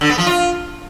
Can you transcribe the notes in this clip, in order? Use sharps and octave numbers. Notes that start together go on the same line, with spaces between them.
D3
B3
F3
F4